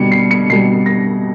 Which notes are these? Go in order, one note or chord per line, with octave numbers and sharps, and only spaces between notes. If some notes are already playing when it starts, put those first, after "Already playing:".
Already playing: B2 G3 C#7
C7
C#7
B2 G3 C7
A#6